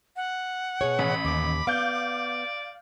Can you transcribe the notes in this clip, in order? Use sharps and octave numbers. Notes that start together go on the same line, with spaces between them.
F#5
B2 G#4 C#5
A1 B5
D#2 D6
B3 D5 F5 G6